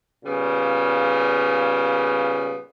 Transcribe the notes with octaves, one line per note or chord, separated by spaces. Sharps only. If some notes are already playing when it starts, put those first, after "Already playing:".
A#2 C#3 G3 B3